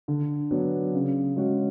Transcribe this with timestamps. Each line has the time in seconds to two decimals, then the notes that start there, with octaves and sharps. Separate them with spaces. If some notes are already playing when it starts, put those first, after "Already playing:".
0.08 D3
0.51 F#3 B3 D4
0.93 C#3
1.36 G#3 C#4 F#4